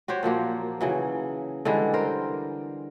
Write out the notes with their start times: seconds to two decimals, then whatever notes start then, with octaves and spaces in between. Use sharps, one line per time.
0.08 F#4 G4 C5 C#5
0.23 A#2 F3 F#3 A#3
0.81 C#3 E3 F#3
1.65 D3 E3 G3 G#3
1.94 A#4 C5 G5